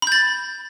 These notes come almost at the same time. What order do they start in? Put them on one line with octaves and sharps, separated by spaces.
B5 G6 A6